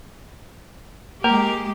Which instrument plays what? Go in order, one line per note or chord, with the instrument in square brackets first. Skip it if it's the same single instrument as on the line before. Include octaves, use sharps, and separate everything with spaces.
[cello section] G#3 G4 [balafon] A#3 [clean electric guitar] A#4